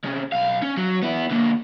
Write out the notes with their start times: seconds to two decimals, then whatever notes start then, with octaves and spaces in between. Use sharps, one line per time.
0.04 C3 C#4
0.32 B1 F5
0.62 C#4
0.77 F#3 F#4
1.03 B3 E4
1.31 D3 A#3